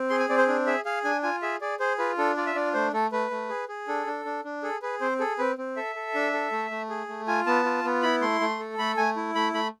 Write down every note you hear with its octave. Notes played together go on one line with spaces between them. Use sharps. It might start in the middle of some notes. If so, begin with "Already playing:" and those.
Already playing: C4
G#4 C6
G#5
C4 D5
C5
D4
G#4 E5
G#4 F5
D4 G#5
F4 G#5
G#4 E5
G#4 D5
G#4 C5
F4 B4
D4 A4
F4 D5
E5
D4 D5
A3 C5
A3 A4
A3 B4
A3
G#4
G#4
D4 A4
D4
D4
D4
G#4 A4
G#4 B4
C4 C5
G#4 A4
C4 B4
C4
A4 E5
A4
D4
A4
A3
A3
G#4
A3
F4 G#5
B3 A5
F4
B3
E4 B5
A3 C6
A3
A4
A3 B5
A3 G#5
E4
A3 B5
A3 B5